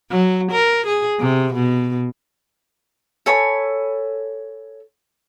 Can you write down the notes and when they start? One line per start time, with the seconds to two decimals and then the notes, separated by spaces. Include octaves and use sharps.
0.11 F#3
0.52 A#4
0.87 G#4
1.20 C3
1.54 B2
3.26 A4 C#5 G#5 B5